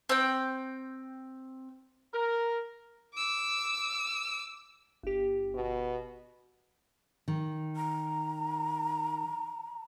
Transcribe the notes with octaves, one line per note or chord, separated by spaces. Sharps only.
C4 G5
A#4
D6 E6
G1 G4
B2
D#3
A#5